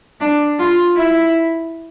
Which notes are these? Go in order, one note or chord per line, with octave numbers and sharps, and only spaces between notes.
D4
F4
E4